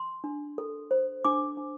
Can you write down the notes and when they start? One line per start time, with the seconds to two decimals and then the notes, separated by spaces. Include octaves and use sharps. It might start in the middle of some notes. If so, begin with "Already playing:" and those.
Already playing: C6
0.24 D4
0.58 A4
0.91 C5
1.25 D4 D6
1.57 D4